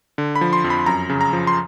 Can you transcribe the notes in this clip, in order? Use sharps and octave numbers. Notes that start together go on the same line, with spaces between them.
D3
B5
F3
C6
F2
B5
F#2 A#5
C#3
A#5
F3
C6